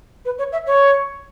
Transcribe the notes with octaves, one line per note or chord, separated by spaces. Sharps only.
B4
C#5
E5
C#5